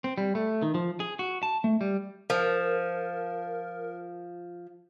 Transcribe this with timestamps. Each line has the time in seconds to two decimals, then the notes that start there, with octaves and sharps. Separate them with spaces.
0.04 C4
0.18 G3
0.35 A3
0.62 D#3
0.74 F3
1.00 G#4
1.19 F#4
1.43 A5
1.64 A3
1.81 G3
2.30 F3 A#4